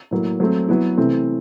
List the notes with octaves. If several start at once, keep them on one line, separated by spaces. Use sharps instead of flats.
A2 F#3 A#3
F#3 A3 C4
F#3 B3 E4
C3 E3 A3 C4